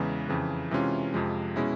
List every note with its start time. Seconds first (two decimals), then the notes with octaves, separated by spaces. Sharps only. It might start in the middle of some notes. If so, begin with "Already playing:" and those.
Already playing: E2 C#3 E3 G#3
0.28 F2 C#3 E3
0.71 C3 E3 G#3 C#4 F4
1.14 F2 C3 F3 G#3
1.56 B2 G#3 C#4 E4